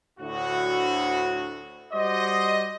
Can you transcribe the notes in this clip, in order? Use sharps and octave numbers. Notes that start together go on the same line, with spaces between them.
D2 A2 F#4
G3 F#4 C5 D5 D#5